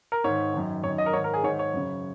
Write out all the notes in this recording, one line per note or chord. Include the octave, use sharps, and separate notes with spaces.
A#4
G#2 D#3 C#5
F#2 D#3
F#2 C#5
D#3
D#5
A#4
G#2 D#3 C#5
A#4
G#4
G#2 D#3 C#5
C#5
F#2 C#3